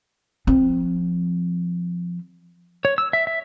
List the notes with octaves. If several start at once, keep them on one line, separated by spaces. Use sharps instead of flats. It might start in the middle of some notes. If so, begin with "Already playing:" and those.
F3 C4
C#5
E6
E5
E5